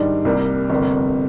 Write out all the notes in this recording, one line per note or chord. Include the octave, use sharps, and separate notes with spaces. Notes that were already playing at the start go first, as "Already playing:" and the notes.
Already playing: G#2 D#3 G3 D4
C2 C3 G3 A#3
G1 F2 C3 G3 A#3